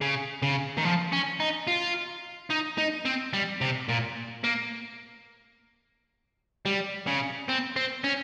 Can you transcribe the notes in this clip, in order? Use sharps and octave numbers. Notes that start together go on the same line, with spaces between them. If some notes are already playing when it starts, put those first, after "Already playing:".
C#3
C#3
D#3
F3
C#4
D#4
F4
D#4
D#4
C4
G3
C3
A#2
A#3
G3
C#3
C4
C4
C#4